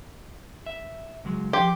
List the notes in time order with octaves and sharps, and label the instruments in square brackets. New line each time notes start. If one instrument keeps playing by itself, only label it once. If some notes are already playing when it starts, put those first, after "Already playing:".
[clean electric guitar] E5
C#2 F#3 G#3
[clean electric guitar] F3 C6 [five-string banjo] G4